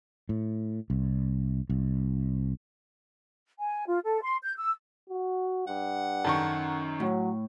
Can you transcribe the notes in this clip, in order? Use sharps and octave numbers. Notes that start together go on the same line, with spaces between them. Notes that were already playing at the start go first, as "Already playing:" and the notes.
A2
C2
C2
G#5
F4
A4
C6
G6
E6
F#4
G2 F#5
F#2 D#3 A4 C#6
A2 F#3